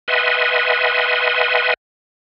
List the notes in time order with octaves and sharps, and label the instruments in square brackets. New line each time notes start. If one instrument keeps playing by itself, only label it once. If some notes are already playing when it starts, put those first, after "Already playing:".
[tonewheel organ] B4 D#5 E5 F#5 G#5 C6